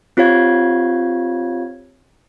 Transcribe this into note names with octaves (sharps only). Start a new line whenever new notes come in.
C4 F4 G4 C#5 F5 G#6